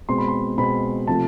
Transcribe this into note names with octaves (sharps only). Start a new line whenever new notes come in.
B2 G#3 C4 C6
B5
C6
B2 G#3 C4 B5
C3 F3 A3 A5